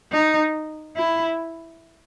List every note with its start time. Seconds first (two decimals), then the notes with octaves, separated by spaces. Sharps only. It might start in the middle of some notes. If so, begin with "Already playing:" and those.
0.12 D#4
0.97 E4